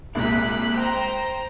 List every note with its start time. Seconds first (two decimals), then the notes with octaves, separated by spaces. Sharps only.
0.15 C2 A#2 G#3 F#6 B6
0.77 C5 G5 A#5